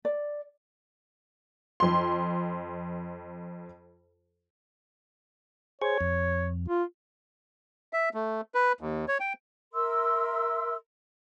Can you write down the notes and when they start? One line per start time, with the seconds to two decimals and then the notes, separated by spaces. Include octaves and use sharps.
0.05 D5
1.80 F2 C6
5.82 G#4 C5 C#5 C#6
6.01 F2
6.68 F4
7.93 E5
8.14 A3
8.54 B4
8.81 D#2
9.08 C#5
9.20 G5
9.73 A#4 E5 C6 E6